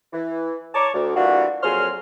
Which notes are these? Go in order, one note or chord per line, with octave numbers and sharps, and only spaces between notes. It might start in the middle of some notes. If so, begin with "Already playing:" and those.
E3
C#5 A5 A#5 C#6 D6
D2
E3 G3 A#3 D4 F4 F#4
F2 A#2 F#3 G#4 C6 F6